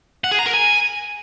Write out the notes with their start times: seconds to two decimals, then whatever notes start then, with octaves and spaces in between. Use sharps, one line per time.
0.24 F#5
0.31 G#4
0.39 A#5
0.46 A#4
0.54 G#5